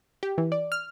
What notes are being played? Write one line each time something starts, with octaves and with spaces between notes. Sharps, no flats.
G4
E3
D5
F6